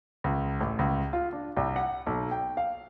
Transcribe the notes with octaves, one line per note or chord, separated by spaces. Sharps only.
C#2
A1
C#2
F4
D4
C2
F#5
B1
G5
F5